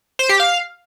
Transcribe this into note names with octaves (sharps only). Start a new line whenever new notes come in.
C5
G4
F5